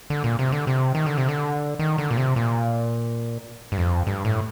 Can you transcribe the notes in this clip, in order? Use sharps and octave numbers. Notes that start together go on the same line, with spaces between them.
D3
A#2
C3
D3
C3
D#3
D3
C3
D3
D#3
D3
A#2
C3
A#2
G2
F2
G2
A2